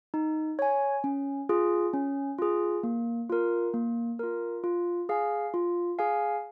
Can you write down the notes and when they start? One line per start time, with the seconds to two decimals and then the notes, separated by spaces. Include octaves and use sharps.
0.14 D#4
0.59 C#5 G#5
1.04 C#4
1.49 F4 G#4
1.93 C#4
2.38 F4 G#4
2.83 A#3
3.30 F4 A#4
3.74 A#3
4.19 F4 A#4
4.64 F4
5.09 G#4 F5 G#5
5.54 F4
5.99 G#4 F5 G#5